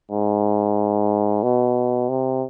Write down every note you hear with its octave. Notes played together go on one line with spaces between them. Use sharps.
G#2
B2
C3